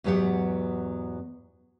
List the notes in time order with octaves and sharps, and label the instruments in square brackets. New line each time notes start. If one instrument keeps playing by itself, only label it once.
[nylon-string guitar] E2 G#2 F#3 B3 G4 F#5